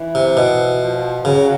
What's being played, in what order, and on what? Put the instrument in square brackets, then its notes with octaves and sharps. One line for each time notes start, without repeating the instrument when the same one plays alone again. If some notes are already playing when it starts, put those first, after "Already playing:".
Already playing: [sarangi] E3
[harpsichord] C3
B2
[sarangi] F3
[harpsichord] C#3 [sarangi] F#3